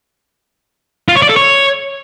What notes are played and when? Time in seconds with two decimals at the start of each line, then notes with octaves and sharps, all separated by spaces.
1.09 F4
1.15 C#5
1.22 D5
1.29 A4
1.36 C#5